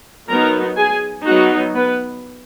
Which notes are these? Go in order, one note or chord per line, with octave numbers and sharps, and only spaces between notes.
F#3 B3 D#4 A#4 A#5
G#4 G#5
F#3 B3 D#4 F#4 F#5
B3 B4